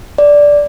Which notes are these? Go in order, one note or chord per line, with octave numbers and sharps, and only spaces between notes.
D5